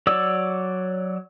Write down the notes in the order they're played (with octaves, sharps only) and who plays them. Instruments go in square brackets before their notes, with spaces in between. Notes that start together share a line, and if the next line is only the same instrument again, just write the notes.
[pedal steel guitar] F#3 C#5 D5 E6